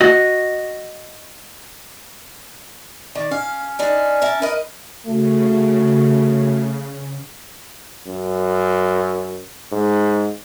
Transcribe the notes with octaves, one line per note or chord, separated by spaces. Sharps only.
F#4 D#5
D#3 D5
C#4 F5
D3 D4 D#4
A#4 E5 A5
A#4 B4 D#5
C#3 A3 F#4
F#2
G#2